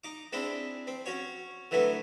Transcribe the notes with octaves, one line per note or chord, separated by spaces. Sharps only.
D#4 D6
G#3 C4 D4 E4
C4
C#4 F#4 C#5
D3 E3 F#3 A3 B3